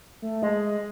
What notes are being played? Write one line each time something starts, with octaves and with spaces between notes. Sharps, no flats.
A3
G#3 D#5